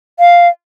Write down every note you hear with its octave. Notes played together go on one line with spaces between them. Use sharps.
F5